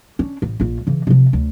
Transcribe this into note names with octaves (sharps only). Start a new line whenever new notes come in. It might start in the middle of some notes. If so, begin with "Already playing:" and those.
C#4 D4
A1
A#1 F4
C#3 E3
C3 F3
D2